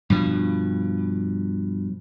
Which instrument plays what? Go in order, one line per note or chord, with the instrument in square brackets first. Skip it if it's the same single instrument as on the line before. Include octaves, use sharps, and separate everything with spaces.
[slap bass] G2 B2 F3